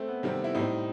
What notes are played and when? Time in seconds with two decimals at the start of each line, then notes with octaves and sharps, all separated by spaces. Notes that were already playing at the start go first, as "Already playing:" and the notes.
Already playing: A3 C4
0.08 B3
0.23 C3 D#3 G3 C4
0.44 E4
0.55 A2 G3 C4 D#4